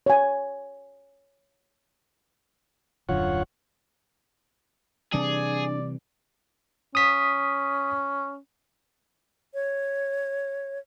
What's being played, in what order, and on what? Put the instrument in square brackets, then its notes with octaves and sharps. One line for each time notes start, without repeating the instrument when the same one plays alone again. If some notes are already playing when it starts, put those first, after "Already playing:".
[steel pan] C#5 G#5
[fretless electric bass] D#1 F#2 D3 [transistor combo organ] F4 C#5 F#5
[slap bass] C3 E3 G3 [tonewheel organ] D4 [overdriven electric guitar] G#4 [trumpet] D5
[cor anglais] C#4 [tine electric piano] D#6 B6
[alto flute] C#5